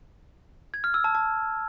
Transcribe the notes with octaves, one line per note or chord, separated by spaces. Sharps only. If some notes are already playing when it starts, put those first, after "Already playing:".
G#6
F6
E6
A5
A5